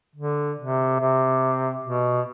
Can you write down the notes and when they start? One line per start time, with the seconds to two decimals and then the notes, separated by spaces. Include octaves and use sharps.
0.15 D3
0.58 C3
1.00 C3
1.84 B2